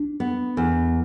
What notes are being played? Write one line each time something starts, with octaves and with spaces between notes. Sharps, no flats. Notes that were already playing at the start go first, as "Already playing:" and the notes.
Already playing: D4
B3
E2